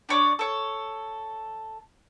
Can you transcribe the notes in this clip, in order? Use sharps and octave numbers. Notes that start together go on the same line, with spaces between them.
D4 C#5 D5
A4 C#5